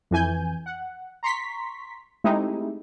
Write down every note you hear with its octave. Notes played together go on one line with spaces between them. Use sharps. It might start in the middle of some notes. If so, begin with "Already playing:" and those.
F2 E3 G#5 G6
F#5
A#5 C6 C#6 B6
G#3 A3 C4 D#4 E4 G4